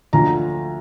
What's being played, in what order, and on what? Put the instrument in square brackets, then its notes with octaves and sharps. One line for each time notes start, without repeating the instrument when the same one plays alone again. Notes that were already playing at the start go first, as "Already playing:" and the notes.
[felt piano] D2 D3 F3 A#5